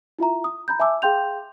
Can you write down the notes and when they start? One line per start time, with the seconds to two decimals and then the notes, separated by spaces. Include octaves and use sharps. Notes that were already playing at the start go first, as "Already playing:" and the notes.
0.19 E4 F4 E5 A#5
0.44 D#6
0.68 A#5 B5 G6
0.80 E5 G#5 A5 D6 E6
1.02 G#4 F5 G5 C6 G6 F7